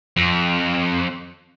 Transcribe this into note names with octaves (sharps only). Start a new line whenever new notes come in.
F2